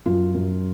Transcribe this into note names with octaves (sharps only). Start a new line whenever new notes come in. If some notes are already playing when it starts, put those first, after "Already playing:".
F#2 F4
F#2